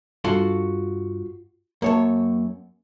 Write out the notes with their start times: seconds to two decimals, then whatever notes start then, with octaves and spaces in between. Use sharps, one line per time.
0.24 G2 F4 F#4 A4
1.82 F#2 A#3 C#5 A5